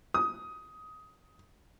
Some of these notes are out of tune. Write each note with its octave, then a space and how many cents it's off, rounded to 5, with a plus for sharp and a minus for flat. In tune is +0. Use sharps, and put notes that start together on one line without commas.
D#6 +15